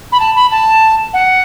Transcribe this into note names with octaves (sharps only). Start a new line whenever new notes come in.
B5
A5
B5
A5
F#5